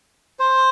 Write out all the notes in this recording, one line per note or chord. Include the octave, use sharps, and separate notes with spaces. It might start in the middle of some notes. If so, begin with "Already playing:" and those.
C5